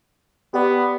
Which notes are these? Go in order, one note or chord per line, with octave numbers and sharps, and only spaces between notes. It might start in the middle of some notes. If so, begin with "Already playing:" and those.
B3 G4 D5